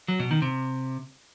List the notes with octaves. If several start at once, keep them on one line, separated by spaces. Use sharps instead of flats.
F#3
B2
D#3
C3